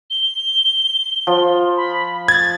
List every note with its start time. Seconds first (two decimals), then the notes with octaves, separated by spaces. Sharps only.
0.10 G7
1.27 F3
1.77 B5
2.28 G#6 A6